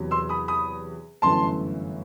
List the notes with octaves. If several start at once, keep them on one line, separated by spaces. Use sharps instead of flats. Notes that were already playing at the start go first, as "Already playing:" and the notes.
Already playing: E2 C3 F#3
C6 E6
B5 D#6
B5 D#6
G1 F#2 E3 A3 A5 C6